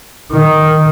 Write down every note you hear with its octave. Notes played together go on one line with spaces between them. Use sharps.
D#3